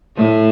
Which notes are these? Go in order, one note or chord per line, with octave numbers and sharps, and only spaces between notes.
A2 A3